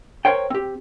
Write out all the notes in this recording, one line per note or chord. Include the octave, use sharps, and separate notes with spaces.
A#4 C5 C#5 G5
C4 G4